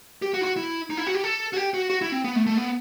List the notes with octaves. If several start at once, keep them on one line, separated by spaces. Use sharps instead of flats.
G4
F#4
E4
F#4
E4
D#4
E4
F#4
G4
A4
F#4
G4
F#4
F#4
E4
C4
B3
A3
A3
B3